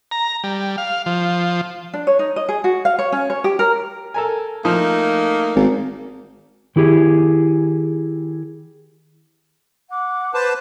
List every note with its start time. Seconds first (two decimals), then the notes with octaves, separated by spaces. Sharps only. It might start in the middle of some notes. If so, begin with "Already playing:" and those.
0.11 A#5
0.44 G3
0.78 F5
1.06 F3
1.93 D4
2.07 C#5
2.19 D#4
2.36 D#5
2.49 G#4
2.64 F#4
2.85 F5
2.99 C#5
3.12 C#4
3.30 C#5
3.44 G4
3.59 A#4
4.14 A4 A#4 G#5
4.65 F3 A3 A#3 D#4
5.55 G#1
6.76 D#3 E4 G4 G#4
9.89 F#5 D6
10.34 B4 C5 A5